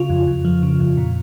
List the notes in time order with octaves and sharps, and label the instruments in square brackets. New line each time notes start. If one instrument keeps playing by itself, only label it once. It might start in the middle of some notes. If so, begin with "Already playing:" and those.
Already playing: [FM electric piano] C#3 F4
F2
F2
F3
C#3
F2
A#2